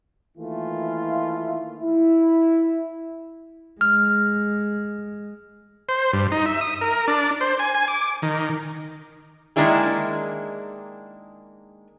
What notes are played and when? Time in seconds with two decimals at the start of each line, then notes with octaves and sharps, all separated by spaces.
0.38 D#3 E3 A3 A#3 E4 F4
1.82 E4
3.81 G#3 F6
5.89 C5
6.13 G2
6.32 D#4
6.46 E5
6.61 D#6
6.81 A#4
7.08 D4
7.41 C5
7.59 G#5
7.75 G#5
7.88 D6
8.22 D#3
9.56 D#3 G#3 A#3 D4 E4 G#4